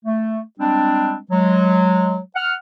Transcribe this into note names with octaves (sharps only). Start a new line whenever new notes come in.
A3
G3 G#3 C4 D4
F#3 G#3
F#5 F6